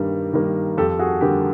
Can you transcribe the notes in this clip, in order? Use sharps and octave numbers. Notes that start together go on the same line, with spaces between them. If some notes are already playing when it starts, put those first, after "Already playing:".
Already playing: G2 D#3 G3 A#3
D#3 G3 A#3
F2 G4 A4
F#4 G#4
D3 G3 A#3 G4